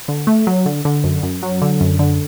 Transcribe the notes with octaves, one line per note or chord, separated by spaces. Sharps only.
D3
A3
F#3
D3
D3
F#2
F#2
F#3
D3
F#2
D3